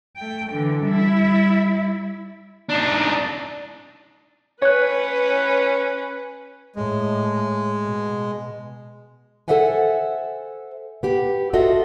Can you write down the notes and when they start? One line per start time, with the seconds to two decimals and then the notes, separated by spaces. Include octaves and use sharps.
0.17 A3 G5
0.50 D3 E3
0.85 G3 E4
2.69 D4 D#4
4.62 C#4 B4 C#5 F#6
6.76 A2 G#3
7.84 B2
9.48 A4 A#4 C5 E5 F#5 G#5
11.03 B3 G4
11.53 F4 F#4 A4 D#5 E5